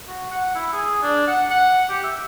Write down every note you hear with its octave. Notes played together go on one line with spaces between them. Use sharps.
F#4
F#5
E4
G#4
D4
F#5
F#5
G4
E5